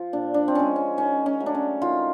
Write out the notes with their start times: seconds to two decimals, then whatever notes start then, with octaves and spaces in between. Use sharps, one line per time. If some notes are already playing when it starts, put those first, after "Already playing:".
Already playing: F3 F4
0.13 A#2 D4
0.34 D4
0.48 C4
0.55 F3 G#3 C#4
0.76 C#4
0.97 D#3 C#4
1.26 C#4
1.40 F#3 A3
1.46 D4
1.55 C#4
1.82 D#3 F4